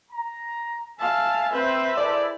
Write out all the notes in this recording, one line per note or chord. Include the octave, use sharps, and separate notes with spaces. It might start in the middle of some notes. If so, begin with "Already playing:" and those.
A#5
E5 F5 G#5 A5
C4 B4 C5 E5
E4 G#4 A4 D5